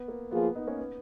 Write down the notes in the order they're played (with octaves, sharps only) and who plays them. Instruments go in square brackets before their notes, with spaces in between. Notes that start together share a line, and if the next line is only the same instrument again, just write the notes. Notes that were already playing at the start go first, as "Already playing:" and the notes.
Already playing: [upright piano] B3
A#3
[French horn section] F3 A#3 F4 G#4 [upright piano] B3
[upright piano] B3 D#4
A#3 C#4
B3